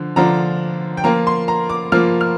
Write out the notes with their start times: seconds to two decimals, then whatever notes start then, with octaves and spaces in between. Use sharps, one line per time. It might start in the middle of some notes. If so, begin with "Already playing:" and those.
Already playing: D3 F3
0.16 D3 F3 D4 F4 A#5
0.97 G5
1.04 F3 A#3 F4 A#5
1.27 C6
1.48 A#5
1.69 D6
1.92 F3 A#3 F4 F6
2.21 F6